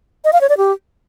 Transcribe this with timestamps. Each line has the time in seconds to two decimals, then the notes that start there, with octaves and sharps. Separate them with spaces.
0.25 D#5
0.33 F5
0.41 C#5
0.49 D5
0.58 G4